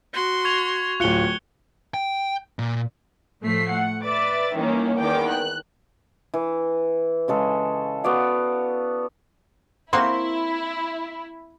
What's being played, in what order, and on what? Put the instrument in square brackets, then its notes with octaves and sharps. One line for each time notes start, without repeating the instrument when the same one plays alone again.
[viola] F#4 C6
[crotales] C#6 G#6 F7
[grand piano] D1 F4 [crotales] F#6 C#7 G7
[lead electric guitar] G5
A#2
[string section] A2 F3 A3 B6 C7
F#5
B4 D5 E5 D6 A6
D#3 E3 G3 A#3 C#4
E2 D#3 G5 D6
F#6
[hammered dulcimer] E3
C#3 G#3 A4
B3 F#4 D5 F5
[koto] A#3 C4 F#4 [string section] E4 [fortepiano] C6